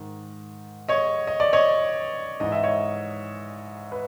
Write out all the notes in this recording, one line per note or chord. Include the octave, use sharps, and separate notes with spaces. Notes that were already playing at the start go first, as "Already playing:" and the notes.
Already playing: G#2 D#3
C#5 D#5
D#5
D5
C#5 D#5
G#2 E3 D#5
E5
C#5 D#5
B4